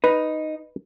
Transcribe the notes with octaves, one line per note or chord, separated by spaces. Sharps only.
D#4 B4